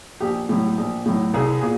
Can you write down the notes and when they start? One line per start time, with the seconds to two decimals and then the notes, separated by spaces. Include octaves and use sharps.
0.20 A#1 G4
0.49 A2 F#3
0.78 A#1
1.06 A2 F#3
1.34 C2 G#4
1.62 A#2 G#4